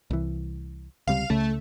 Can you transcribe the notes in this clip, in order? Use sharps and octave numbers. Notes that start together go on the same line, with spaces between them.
C2 E3
C#2 C3 G3 F5
C#2 C#3 A3